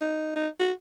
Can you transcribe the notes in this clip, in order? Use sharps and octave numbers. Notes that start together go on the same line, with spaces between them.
D#4
D#4
F#4